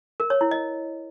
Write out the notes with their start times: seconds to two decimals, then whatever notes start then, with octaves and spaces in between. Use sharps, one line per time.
0.20 A#4
0.30 C#5
0.41 E4
0.51 D#5